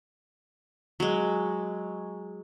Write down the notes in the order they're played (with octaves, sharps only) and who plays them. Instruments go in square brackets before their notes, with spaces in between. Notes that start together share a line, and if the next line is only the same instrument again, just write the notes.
[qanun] F#3 G#3